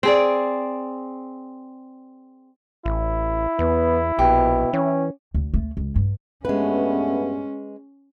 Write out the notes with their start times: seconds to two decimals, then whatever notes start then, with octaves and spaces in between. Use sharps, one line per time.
0.03 C4 G#4 D5
2.86 A1 E4
3.59 E2 B3
4.19 A#1 B2 G4
4.73 E3 C#4
5.34 D2
5.54 A3
5.77 C#2
5.96 G2
6.45 G2 G#3 A3 B3 C#4 B4